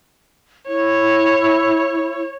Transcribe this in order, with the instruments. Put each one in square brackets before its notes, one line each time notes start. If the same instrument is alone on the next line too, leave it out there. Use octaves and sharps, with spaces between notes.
[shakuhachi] E4 [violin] C#5